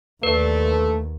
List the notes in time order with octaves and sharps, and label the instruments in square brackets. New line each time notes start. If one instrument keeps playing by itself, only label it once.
[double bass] D#2 [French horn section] D3 A3 [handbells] B4